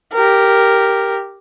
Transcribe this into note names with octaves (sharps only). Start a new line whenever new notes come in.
G4 A#4